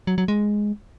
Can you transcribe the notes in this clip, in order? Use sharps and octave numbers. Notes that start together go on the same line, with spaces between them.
F#3
F#3
G#3